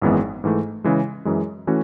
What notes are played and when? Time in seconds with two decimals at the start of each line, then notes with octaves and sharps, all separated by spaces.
0.02 G#1 F#2 E3 G#3 B3
0.44 G#2 E3 A3
0.84 C#3 E3 G#3
1.25 F#2 E3 G#3
1.67 E3 A3 C#4 F#4